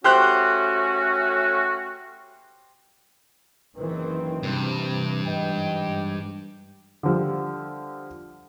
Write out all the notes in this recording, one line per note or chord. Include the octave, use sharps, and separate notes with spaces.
A3 C#4 F#4 G4 C5 F#6
F#1 D#3 E3 C4 B4
G2 C3 E3
G#2 D#5 G5
D3 F3 G3